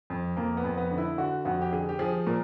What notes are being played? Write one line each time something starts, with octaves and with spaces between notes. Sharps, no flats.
F2
F2 A#3
B3
F2
B3
D3
E4
D3 F#4
F2 F#4
G4
D3 G#4
G4
F3 G#4
A#2 A#4